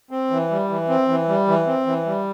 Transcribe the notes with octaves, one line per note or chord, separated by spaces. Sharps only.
C4
E3
G3
E3
C4
E3
G3
E3
C4
E3
G3